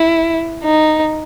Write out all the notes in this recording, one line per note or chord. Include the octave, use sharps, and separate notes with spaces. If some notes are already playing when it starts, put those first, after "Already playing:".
Already playing: E4
D#4